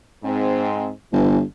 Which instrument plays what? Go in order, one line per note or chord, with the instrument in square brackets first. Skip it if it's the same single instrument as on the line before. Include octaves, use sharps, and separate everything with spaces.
[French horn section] G#2 C4
[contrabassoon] G1 [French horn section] E3